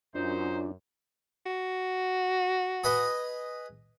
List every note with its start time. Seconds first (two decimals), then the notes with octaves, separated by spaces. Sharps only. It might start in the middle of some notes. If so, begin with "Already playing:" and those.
0.15 F#2 D4 D#4 F4 C5
1.46 F#4
2.84 G#4 B4 D#5